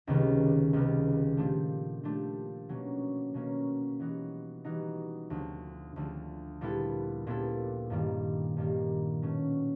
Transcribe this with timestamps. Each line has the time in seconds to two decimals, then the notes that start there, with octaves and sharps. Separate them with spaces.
0.07 C#2 C3 D#3 G3 B3
0.73 C#2 C3 D#3 G3 B3
1.37 A#2 F3 A3 D4 G4
2.03 A#2 F3 A3 D4 G4
2.69 B2 F#3 A#3 C#4
3.34 B2 F#3 A#3 C#4
3.99 E3 G3 B3 D#4 F#4
4.65 E3 G3 B3 D#4 F#4
5.30 D2 D3 F3
5.96 D2 D3 F3
6.61 A#2 G3 B3 E4 A4
7.27 A#2 G3 B3 E4 A4
7.90 G2 D#3 G3 A#3
8.57 G2 D#3 G3 A#3
9.22 B2 F#3 A3 C#4